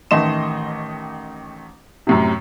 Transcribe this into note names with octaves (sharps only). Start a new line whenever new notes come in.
A1 D#3 A3 D#5 C6 E7
F#2 A2 C3